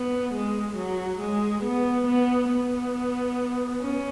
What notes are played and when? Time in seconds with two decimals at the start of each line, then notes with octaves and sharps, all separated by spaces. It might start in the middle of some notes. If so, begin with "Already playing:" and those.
Already playing: B3
0.34 G#3
0.76 F#3
1.20 G#3
1.64 B3
2.07 B3
2.50 B3
3.81 C#4